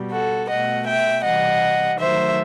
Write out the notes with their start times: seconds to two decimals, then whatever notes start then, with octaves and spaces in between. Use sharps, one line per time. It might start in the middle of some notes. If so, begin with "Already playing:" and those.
Already playing: B2 G3
0.11 F#4 A4
0.49 B2 A3 D#5 F#5
0.86 E5 G5
1.24 C3 E3 G3 D#5 F#5
1.98 D#3 F#3 A3 C5 E5